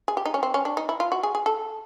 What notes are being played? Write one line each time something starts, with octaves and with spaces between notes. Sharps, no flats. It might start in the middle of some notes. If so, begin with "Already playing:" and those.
G#4
G4
D#4
C#4
C4
C#4
D4
D#4
E4
F4
F#4
G#4
G#4
A4